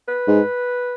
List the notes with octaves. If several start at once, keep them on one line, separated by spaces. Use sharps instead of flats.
B4
G#2